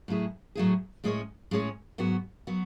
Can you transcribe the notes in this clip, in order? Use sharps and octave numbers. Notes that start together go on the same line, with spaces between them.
A2 F#3 A3 E4 G#4
A2 F#3 A3 E4 G#4
A2 G#3 C#4 G#4 C#5
A2 G#3 C#4 G#4 C#5
G#2 F#3 B3 F#4
F#3 B3 F#4